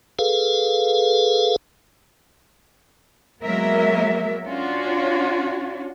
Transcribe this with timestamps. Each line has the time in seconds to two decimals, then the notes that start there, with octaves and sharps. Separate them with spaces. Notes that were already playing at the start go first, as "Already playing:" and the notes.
0.19 G#4 A4 B4 F5
3.41 F#3 G#3 A#3 B3 A#4 E5
4.45 C#4 D4 F4 F#4 C#5